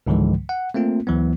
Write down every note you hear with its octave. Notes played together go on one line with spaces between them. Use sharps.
C#2 G#2 D3 E3 F3 G#3
F#5
A3 A#3 C4 F4
D2 E3 F#3 B3